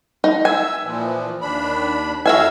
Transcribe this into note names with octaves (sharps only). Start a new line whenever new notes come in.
D#4
E5 G#5 E6
A#2 E3 F3
D#2 D4 B5
F2 F#4 E5 F5 G#5 E6